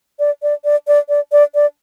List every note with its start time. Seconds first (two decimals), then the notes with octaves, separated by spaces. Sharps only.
0.19 D5
0.43 D5
0.65 D5
0.88 D5
1.09 D5
1.32 D5
1.55 D5